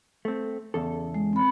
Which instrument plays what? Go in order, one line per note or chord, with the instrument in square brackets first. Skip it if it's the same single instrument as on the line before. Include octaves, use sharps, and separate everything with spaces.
[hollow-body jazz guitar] A3 C4
E2 C#3 A4
[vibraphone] G#3
C4 B5